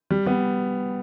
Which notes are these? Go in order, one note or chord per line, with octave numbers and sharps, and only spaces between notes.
G3
G3 B3